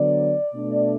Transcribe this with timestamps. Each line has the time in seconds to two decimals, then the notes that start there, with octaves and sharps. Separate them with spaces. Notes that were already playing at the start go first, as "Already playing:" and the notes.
Already playing: D3 F#3 B3 D5
0.53 B2 A3 D4